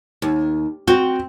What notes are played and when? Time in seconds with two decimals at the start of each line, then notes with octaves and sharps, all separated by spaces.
0.22 D#2
0.88 C4 F#4